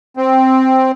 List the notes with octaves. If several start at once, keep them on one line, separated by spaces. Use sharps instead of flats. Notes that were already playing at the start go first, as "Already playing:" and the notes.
C4